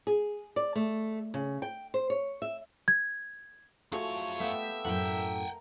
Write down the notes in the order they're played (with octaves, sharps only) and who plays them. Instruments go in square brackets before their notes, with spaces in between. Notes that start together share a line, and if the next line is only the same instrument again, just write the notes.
[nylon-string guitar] G#4
D5
A3
C#3
G5
C5
C#5
E5
[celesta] G#6
[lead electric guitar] F#2 C#5 [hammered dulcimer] F3 A3 [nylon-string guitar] F#4 G#4 A4
[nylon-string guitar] A3 F5 [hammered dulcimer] B3 G5 [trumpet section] G4 E5
[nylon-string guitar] F#2 A2 A3 [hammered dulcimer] A#4 [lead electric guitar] F#5 G5